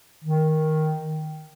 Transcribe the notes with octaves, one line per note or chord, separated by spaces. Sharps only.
D#3